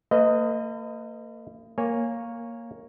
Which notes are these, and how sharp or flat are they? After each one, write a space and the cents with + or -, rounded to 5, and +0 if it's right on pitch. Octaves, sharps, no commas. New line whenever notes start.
A#3 -40 B4 +35 D#5 +0
A#3 +0 C#5 +0 G#5 -15